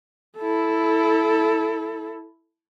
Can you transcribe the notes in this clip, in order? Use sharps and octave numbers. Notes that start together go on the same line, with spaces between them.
E4 A4